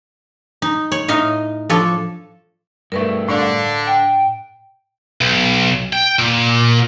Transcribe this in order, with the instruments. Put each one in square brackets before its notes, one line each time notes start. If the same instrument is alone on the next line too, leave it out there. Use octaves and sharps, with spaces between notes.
[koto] D#4
C#5
A2 D#4 D#5 F5
F3 D4 A4 C#5
[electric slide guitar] G2 A3 [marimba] A#4 B4 C#6
[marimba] A2 F5 [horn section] D3 D4
[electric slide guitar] G5
[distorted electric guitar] B1
G5
A#2